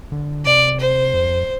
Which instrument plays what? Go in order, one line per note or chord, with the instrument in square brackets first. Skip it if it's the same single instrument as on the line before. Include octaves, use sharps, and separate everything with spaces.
[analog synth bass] D3
[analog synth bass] C3 [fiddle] D5
[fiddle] C5
[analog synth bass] F2